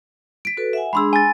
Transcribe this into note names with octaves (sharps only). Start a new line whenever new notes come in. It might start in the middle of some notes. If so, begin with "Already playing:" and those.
B6 D7
F#4 A4 B4
E5 F#5 G#5
G#3 D4 G#4 B5 C6 E6
G#5 A6